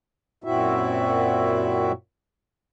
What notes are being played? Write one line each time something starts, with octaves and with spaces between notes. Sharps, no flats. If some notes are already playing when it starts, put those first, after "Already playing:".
F#2 A#2 C4 E4 F#4 E5